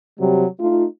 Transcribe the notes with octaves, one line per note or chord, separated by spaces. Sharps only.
C3 F#3 G3
A3 D#4 F4